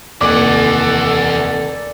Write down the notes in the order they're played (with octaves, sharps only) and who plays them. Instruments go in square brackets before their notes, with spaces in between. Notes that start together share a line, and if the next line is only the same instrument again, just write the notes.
[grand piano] F1 D#2 D6 [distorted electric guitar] E3 F#5 [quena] A4 [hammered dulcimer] D5 G#5